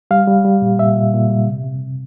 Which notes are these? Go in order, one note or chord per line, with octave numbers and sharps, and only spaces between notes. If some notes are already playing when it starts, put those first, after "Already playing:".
G3 F5
G3
G3
A#2
A#2 E5
A#2
A#2
G3
C3
C3